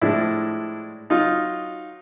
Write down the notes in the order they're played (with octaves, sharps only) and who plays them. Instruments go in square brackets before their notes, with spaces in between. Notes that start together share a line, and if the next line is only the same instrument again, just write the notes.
[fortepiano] A2 F3 G#3 D4 E4
F#3 D#4 F4